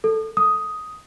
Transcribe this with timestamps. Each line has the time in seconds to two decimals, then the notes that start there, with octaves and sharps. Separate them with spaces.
0.04 A4
0.37 D#6